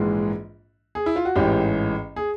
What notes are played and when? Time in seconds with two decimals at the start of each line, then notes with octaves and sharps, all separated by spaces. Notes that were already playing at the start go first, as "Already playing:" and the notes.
Already playing: A#1 G#2 E3 G#3
0.95 G#4
1.06 E4
1.16 F4
1.25 F#4
1.36 A1 G#2 E3 G4
2.16 G#4